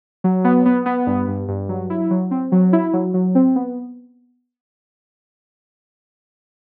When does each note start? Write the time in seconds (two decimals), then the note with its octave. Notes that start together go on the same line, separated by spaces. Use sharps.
0.24 F#3
0.44 B3
0.66 B3
0.86 B3
1.07 G2
1.28 G2
1.48 G2
1.69 F#3
1.90 E4
2.10 F#3
2.31 C4
2.52 F#3
2.73 E4
2.93 F#3
3.14 F#3
3.35 C4
3.56 B3